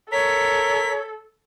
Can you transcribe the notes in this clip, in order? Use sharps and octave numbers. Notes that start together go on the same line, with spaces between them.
A4 A#4 C#5 B6